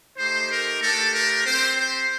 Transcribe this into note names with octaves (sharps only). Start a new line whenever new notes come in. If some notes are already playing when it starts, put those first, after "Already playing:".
A3 D#4 G4 C5
A#4
A3 D4 G4 A4
A#4
C4 G4 C5
C5